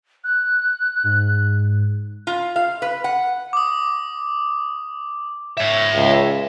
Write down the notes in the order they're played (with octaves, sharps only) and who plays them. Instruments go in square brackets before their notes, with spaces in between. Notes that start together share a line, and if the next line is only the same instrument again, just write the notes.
[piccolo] F#6
[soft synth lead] G#2
[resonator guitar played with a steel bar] F4
F5
B4
F#5
[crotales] D6 D#6
[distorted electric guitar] C#5 E5
[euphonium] C#2